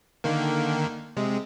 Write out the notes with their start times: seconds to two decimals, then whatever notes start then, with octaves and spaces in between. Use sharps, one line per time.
0.24 D3 D#3 A#3
1.17 C3 G#3